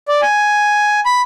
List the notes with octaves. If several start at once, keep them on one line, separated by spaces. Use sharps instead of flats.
D5
G#5
B5